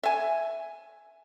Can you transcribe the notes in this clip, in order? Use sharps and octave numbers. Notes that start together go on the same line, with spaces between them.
E5 G#5